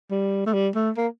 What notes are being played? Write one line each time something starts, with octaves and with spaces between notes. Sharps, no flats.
G3
A3
G3
A3
A#3